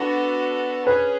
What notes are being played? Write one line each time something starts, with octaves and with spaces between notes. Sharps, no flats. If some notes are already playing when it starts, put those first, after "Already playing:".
Already playing: B3 D4 F#4 A4
C#4 G#4 B4 C#5